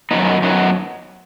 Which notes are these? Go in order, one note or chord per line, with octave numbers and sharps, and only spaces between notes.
F#2 D#3 F#3 B3 D#4
F#2 D#3 F#3 B3 D#4